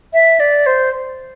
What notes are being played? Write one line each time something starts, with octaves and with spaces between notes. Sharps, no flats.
E5
D5
C5